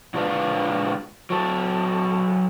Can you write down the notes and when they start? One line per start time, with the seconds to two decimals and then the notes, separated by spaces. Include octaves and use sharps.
0.14 A#2 G#3 D4 F4 B4 F5
1.30 F#3 A4